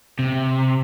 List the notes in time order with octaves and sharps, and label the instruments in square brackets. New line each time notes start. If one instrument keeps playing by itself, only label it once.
[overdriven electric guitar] C3